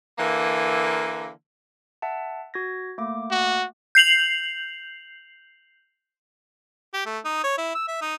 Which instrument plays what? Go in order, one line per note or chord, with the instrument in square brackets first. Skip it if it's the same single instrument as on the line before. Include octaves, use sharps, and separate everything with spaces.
[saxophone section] D3 E3 A#3
[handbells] E5 F#5 A5
F#4 G#6 A#6
A3 A#3 D6
[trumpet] F#4
[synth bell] G6 C7 F7 F#7
[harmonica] G4
A3
D#4
C#5
E4
E6
E5
D#4